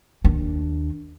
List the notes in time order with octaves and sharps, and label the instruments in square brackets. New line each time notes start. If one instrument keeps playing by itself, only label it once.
[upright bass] D#2 D4